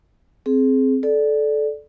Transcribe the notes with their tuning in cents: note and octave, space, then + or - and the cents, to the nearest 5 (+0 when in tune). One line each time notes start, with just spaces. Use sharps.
C4 +0 G#4 +25
A4 -20 D5 +0